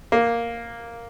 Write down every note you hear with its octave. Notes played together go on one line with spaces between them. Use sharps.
A#3